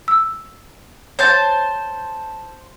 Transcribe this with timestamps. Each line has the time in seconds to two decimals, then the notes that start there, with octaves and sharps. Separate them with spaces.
0.08 E6
1.19 C5 C#5 A5 G6 G#6